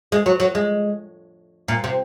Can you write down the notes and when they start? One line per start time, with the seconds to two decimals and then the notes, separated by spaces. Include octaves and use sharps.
0.12 G#3
0.26 F#3
0.40 F#3
0.55 G#3
1.68 A#2
1.84 C3